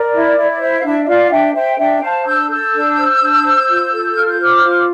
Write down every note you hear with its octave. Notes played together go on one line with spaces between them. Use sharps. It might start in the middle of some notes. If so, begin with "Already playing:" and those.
Already playing: A#4 D5
E4
E4
C5 E5
F5
D4 E5
E5
F4 D5 F5
D4 E5 G5
C5 E5 G5
D4 E5 G5
C5 F5 A5
D4 E6 G6
A4 E6 G6
D4
C5
D4
C5
F4
A4
F4 F6
G6
C5 D6 F6
F4